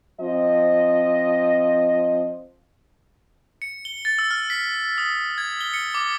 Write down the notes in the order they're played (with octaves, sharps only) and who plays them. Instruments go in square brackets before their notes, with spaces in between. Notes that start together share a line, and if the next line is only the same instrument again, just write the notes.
[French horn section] F3 C4 D#5
[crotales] C#7
G7
A6
E6
F6
B6
D#6
G#6
G7
C#7
D6